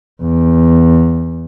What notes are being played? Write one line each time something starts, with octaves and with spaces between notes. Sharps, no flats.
E2